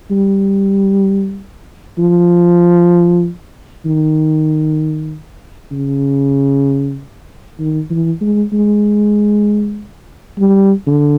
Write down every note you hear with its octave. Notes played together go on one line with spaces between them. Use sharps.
G3
F3
D#3
C#3
D#3
E3
G#3
G#3
G3
D3